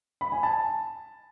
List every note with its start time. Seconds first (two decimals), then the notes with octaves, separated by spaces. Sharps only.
0.21 B5
0.32 G#5
0.43 A5